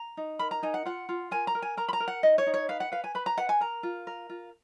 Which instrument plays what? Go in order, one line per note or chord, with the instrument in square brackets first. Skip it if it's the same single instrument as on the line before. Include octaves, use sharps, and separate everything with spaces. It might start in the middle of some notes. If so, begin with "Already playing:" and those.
Already playing: [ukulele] A#5
D#4
A#4 B5
A#5
D#4 G#5
F#5
F4 F#5
F4
A#4 G#5
A#5
A#4
G#5
A#4 A#5
B5
A#5
A#4
F#5
D#4 D#5
C#5
D#4
C#5
B4 F5
F#5
B4 F5
G#5
B4 B5
A#5
B4 F#5
G#5
A#4 A#5
F4
A#4
F4